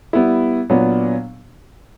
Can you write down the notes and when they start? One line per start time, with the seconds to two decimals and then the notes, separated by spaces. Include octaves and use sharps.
0.13 G3 B3 E4
0.70 A#2 F#3 B3 D4